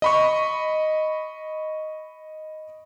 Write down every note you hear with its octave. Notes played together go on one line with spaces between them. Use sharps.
D#5 B5 C#6